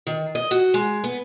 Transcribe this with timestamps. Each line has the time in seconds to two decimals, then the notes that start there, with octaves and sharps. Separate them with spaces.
0.07 D#3
0.35 D#5
0.51 F#4
0.74 G#3
1.04 B3